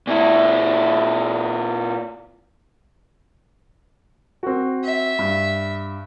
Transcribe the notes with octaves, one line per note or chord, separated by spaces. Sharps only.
A#2 E4
C4 F#4
E5
G2